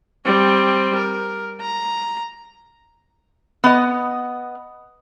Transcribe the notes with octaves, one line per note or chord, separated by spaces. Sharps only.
G3 C4
A#4
A#5
B3 D#5